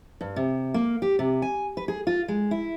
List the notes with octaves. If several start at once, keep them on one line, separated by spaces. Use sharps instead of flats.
G2
C3
A#3
G4
C3
G#5
B4
G#4
F4
G#3
E4